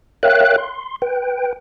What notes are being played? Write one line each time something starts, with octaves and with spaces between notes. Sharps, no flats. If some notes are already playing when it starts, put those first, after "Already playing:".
A#4 C#5 E5 F5 G5 F#6
C6
B4 G5